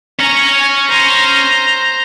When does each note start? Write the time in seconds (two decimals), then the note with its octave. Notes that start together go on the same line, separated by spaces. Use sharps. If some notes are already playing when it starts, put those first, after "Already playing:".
0.19 C#4 C#5 A#5
0.60 G#5
0.89 C5 A#5